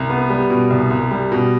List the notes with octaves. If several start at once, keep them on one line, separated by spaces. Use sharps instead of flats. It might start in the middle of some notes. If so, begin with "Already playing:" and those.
Already playing: C2
B3
G3
B2
C2
C2
G3
B2